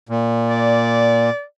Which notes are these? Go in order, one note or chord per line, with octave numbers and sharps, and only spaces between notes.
A#2
D5